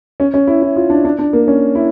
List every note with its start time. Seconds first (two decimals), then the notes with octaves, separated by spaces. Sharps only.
0.20 C#4
0.34 C#4
0.47 E4
0.62 E4
0.76 F4
0.90 D4
1.05 D4
1.19 D4
1.33 A#3
1.48 C#4
1.75 E4